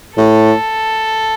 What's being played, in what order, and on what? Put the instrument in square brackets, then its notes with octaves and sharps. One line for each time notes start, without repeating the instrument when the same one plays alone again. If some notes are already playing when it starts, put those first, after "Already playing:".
[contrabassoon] A2 [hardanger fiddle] A4